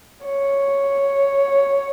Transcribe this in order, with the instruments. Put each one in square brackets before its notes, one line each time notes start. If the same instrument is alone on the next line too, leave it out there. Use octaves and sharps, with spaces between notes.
[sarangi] C#5